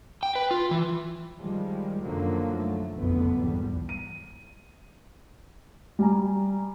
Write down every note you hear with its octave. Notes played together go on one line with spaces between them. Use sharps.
G5
B4
F4
E3
D#3 F3 G3 G#3
F#2 D3 D#3 F3 F#3 A#3
A3
F#1 B1 F2 D3 B3
G#1 E2 G3
D#7
G3 G#5 A#5